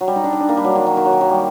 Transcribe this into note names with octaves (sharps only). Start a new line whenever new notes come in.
F#3
G3
D#4
D4
D#4
D4
A#3
G3
F#3
D#3
F#3
D#3
F#3
D#3
F#3
G3